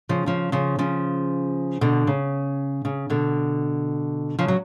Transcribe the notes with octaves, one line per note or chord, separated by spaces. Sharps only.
C#3 F3
C#3 F3
C#3 F3
C#3 F3
B2 D3
C#3
C#3
B2 D3
C#3 F3
F#3